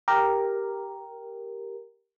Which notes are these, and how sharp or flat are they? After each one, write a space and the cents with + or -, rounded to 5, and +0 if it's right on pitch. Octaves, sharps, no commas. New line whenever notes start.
G4 +0 A#4 +0